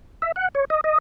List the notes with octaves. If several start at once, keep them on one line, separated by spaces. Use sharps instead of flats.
E5
F#5
C#5
D#5
D#5